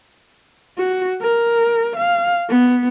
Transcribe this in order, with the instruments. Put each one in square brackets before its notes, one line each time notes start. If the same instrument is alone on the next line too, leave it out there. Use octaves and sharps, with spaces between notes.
[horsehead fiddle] F#4
A#4
F5
B3